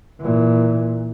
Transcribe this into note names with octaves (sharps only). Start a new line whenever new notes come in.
A#2 E3